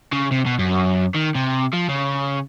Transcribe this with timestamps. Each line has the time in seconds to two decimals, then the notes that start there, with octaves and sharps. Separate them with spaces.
0.12 C#3
0.31 C3
0.46 B2
0.59 F#2
1.14 D#3
1.35 C3
1.73 F3
1.88 C#3